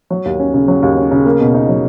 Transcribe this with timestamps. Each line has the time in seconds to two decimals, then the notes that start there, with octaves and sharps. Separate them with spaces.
0.11 F#3
0.25 D#2
0.40 C#4
0.54 C#3
0.68 F#3
0.82 D#2
0.97 C#4
1.11 C#3
1.26 A#3
1.40 B2
1.54 D#4
1.69 F#3